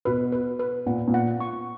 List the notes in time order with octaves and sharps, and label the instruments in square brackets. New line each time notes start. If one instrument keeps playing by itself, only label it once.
[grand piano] B2 [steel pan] B4
[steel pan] B4
B4
[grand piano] A#2 [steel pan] F#5
[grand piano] A#2
[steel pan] F#5
C#6